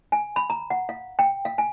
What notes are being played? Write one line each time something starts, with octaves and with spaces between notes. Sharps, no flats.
G#5
B5
A#5
F#5
F5
G5
F5
G#5